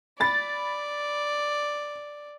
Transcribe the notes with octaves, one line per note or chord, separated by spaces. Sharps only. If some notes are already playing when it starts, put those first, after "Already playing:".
D5 B5 A6